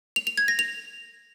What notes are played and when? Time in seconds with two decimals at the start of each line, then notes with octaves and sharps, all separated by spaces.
0.16 F7
0.27 F7
0.38 G#6
0.48 A#6
0.59 F7